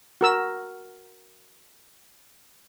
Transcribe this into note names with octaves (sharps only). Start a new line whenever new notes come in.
F#4 A#4 E6